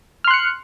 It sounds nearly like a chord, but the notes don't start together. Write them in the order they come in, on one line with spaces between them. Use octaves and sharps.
F6 C6 F#6 C#7